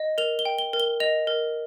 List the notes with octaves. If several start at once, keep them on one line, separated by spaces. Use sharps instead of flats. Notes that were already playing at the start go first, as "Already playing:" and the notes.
Already playing: D#5
A#4 F7
G7
G5
G7
A#4
G7
D#5 F7
A#4